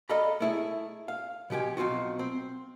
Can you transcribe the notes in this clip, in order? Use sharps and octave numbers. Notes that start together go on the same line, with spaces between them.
A4 D5 D#5 F5 A#5 B5
A3 E4 G#4
F5
B2 F3 G4 G5 G#5
B1 F#2 C4 F4 F#4
C4